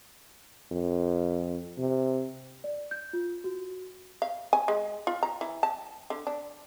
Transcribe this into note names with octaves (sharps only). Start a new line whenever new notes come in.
F2
C3
D5
G6
F4
F#4
F5
G#5
G#3
F4
A#5
E3
A5
D3
D4